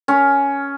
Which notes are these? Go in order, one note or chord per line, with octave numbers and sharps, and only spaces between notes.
C#4